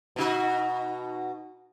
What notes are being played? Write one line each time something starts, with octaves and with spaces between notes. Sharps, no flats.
B2 D#4 F#4